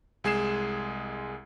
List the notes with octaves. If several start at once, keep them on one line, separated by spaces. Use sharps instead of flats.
C2 G#3 G#4 G#6 C7 E7